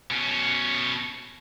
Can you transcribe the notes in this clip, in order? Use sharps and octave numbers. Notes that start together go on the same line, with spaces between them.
B2 C#4